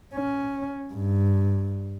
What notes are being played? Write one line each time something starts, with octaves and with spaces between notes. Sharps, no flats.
C#4
G2